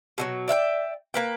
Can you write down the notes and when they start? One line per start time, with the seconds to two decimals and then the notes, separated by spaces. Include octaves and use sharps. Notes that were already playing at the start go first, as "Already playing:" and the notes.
0.18 B2 D3 F#3
0.48 D5 E5 F5 G5
1.14 A#3 B4 G5